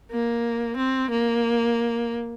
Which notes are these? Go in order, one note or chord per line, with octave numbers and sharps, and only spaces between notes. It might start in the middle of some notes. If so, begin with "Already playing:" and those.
A#3
C4
A#3